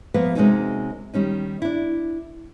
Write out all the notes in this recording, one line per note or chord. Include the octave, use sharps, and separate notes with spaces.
F3 A#3 B3 B4 E5 F#5
C3 G#3 A#3 C#4 D#4 F#4
D#3 G3 C#4 D#4
D4 E4